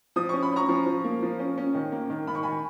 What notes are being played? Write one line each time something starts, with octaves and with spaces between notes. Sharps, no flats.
F3 D#6
C#4 C#6
B5
C#4 A#5 C#6
F3
F3
A#3
F3
C#4
C#4
D#3
A#3
D#3
D#3 B5
C#6
D#3 G#5 B5